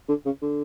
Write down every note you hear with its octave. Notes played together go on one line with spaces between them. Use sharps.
D3
C#3
D3